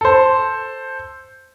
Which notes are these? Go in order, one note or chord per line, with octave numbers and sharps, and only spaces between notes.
A4 C5